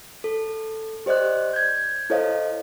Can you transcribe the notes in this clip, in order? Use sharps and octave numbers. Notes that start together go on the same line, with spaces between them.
A4
G4 C5 D5 D#5 F#6
G6 G#6
E4 A4 C5 C#5 D#5 F5